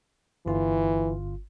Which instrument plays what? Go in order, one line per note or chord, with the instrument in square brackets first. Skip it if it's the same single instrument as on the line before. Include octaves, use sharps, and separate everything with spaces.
[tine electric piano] G1 F4 [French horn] E3